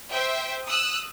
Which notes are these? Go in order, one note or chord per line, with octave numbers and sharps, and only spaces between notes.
C5 E5 G5
D#6 E6 F#6